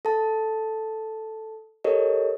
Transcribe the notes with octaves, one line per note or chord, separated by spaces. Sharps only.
A4 A5
G4 A4 A#4 C#5 D#5